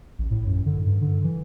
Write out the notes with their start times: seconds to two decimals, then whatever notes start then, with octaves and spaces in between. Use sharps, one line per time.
0.18 A1
0.30 A2
0.46 F#2
0.66 D3
0.86 G2
1.01 D3
1.24 E3